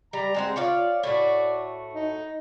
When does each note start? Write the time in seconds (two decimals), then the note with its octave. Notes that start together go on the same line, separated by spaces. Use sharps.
0.13 G3 A#5
0.34 G#3 C4 F#5
0.56 F4 C#5 D5 F5
1.03 A2 A3 F#4 D5
1.93 D#4